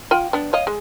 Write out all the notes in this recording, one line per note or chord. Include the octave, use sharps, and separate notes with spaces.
F4 G5
B3 D4
C#5 D#5 F5
G#3